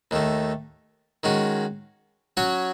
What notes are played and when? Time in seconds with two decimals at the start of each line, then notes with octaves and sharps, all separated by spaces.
0.11 D#2 D#3 A3
1.23 D#3 G#3 C#4 F#4
2.37 F#3 C#4 F#4 C#5